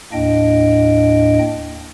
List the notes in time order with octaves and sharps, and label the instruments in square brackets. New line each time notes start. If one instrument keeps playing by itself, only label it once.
[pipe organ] D#2 A2 A#3 D4 D#5 G5